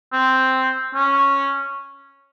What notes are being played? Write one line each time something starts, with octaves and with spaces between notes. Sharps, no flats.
C4
C#4